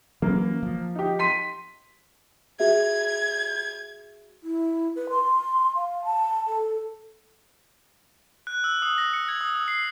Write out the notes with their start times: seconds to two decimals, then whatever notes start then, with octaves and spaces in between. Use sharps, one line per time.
0.22 E3 F#3 A#3 C#4
0.63 F3
0.95 D#4 G4
1.19 C6 B6 D#7
2.60 F#4 G#4 E5 G#6
4.42 E4
4.96 B4
5.10 C6
5.75 F5
6.04 A5
6.47 A4
8.47 F#6
8.64 E6
8.82 D#6
8.98 A#6
9.13 C#7
9.28 G#6
9.41 D#6
9.55 E6
9.68 C7